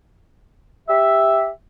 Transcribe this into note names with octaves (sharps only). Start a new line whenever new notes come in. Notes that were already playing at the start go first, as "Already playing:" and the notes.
G4 E5